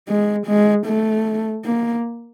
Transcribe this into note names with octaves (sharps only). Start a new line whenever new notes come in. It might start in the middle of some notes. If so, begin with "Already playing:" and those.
G#3
G#3
A3
A#3